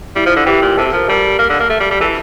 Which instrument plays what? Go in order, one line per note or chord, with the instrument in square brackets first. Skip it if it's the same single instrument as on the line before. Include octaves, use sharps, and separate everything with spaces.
[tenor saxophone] G3 [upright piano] E4
[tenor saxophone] F3
D3
[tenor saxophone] E3 [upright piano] G4
[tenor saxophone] A#2
[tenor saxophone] C3 [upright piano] A4
[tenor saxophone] F3 [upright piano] A#4
[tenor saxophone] G3 [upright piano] A4
[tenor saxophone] A#3
D3
A#3
A3
G3
G3
[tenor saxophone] E3 [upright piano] A4